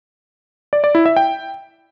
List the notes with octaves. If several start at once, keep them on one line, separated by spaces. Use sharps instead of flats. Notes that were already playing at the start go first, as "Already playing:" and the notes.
D5
D5
E4
E5
G5